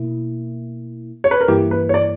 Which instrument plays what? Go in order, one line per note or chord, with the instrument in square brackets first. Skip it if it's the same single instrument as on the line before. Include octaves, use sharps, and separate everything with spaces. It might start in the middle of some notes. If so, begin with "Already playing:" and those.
Already playing: [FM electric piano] B2 A#3 E4
[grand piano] C#5
B4
A#4
[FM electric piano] G2 E3 A#3 E4 [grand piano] G4
[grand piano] B4
C#5
D5